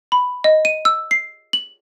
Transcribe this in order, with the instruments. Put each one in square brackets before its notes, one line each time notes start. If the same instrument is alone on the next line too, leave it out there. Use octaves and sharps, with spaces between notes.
[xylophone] B5
D#5
D#7
E6
C7
F#7